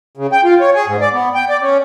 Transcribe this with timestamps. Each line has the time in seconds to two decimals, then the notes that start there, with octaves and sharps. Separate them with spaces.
0.17 C#3
0.32 G5
0.44 F4
0.60 C#5
0.75 G#4
0.88 G#2
1.01 D5
1.13 B3
1.35 G5
1.49 D5
1.62 C#4